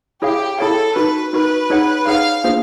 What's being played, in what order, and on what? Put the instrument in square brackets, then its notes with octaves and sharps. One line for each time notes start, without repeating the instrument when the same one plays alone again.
[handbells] E4 G#4 C#5 F5 [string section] G4
[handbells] E4 G#4 C#5 F5 [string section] A4
[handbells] D#4 F#4 A#4 [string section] B4
[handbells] D#4 F#4 A#4 [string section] B4
[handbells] D#4 G#4 C#5 F#5
[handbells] D#4 G#4 C#5 F#5 [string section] F5
[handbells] A#3 D4 F4 G#4 C5